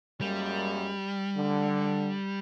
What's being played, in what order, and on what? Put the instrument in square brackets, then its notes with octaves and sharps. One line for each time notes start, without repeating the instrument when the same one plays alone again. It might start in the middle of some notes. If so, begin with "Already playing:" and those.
[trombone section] F#2 G#3 A#3 [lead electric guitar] G3
[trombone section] D3